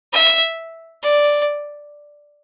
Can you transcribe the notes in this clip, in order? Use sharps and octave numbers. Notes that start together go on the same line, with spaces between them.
E5
D5